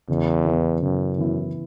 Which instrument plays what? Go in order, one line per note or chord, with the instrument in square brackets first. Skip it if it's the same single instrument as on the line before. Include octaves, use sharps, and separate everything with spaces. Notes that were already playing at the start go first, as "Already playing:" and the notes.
[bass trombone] E2 [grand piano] C#3
[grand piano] E3 B3 E4
[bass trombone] F#2 [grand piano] C#3
[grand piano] E3 B3 E4